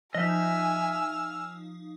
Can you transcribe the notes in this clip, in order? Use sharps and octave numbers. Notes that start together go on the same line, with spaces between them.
F3 D#4 D#5 E5 G#5 E6 F6